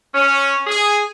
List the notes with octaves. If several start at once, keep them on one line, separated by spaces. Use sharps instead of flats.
C#4
G#4